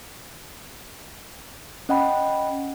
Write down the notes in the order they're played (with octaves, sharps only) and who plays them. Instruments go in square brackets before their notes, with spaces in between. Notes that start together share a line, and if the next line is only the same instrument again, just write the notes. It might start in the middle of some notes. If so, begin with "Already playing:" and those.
[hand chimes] C#4 D#5 F#5 G5 B5